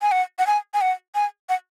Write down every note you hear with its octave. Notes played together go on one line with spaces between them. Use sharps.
G#5
F#5
F#5
G#5
G#5
F#5
G#5
F#5